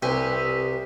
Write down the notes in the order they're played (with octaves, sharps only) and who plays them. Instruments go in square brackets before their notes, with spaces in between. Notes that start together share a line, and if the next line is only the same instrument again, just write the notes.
[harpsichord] C2 [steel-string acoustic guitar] G4 B4 G#5 [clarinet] E5